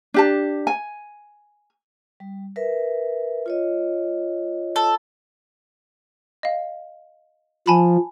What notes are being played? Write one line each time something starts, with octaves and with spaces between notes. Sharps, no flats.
D4 G4 A5
G#5
G3
A#4 B4 E5
F4 C#5 D#5
A4
D#5 F5
F3 G#5 A5 B5